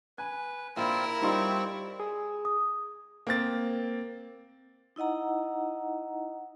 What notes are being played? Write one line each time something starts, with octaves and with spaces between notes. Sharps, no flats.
B4 G#5
A#1 C4 E4 F4 A#4
G3 C4 D#4 F4 E5 C#6
G#4
D#6
A#3 C4 A6
D#4 E4 D#5 F#5 A#5